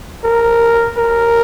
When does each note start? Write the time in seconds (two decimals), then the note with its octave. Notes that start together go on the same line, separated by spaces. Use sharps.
0.24 A#4
0.97 A#4